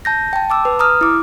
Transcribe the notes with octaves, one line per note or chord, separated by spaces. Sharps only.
A5 G6 A#6
G5 A5
A5 D6 E6
B4
A#5 D#6 F6
E4 D6